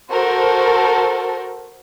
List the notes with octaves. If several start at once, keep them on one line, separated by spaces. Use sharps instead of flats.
F#4 A4 A#4 C5